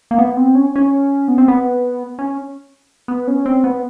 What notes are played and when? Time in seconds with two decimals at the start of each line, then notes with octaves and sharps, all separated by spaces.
0.11 A#3
0.18 B3
0.37 C4
0.55 C#4
0.76 C#4
1.28 B3
1.38 C4
1.48 B3
2.19 C#4
3.08 B3
3.28 C#4
3.46 C4
3.64 B3